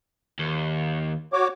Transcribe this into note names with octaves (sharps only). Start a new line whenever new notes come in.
D#2
F#4 C#5 D6